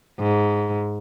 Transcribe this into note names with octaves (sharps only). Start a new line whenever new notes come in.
G#2